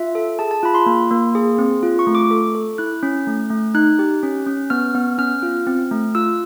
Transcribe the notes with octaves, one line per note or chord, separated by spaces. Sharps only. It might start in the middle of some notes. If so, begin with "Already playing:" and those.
Already playing: F4 E5
A4
G#4 A5
A5
F4 B5
C6
A#3
A#3
G#4
C4
F4
C#6
A3
D6
A4
A4
E4 F#6
C#4
A3
A3
D#4 F#6
G4
C#4
C#4
B3 F6
B3
C#4 F6
F4
C4
A3
F4 E6